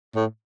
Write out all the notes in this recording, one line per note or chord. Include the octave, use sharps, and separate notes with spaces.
A2